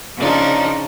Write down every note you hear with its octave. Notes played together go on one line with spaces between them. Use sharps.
C#3 F3 D4 D#4